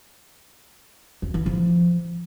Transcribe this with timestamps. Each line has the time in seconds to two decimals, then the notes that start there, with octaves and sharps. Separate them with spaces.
1.22 F#2
1.34 E3
1.46 F3